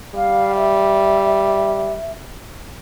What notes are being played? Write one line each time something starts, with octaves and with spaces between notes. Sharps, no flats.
G3 F5
E5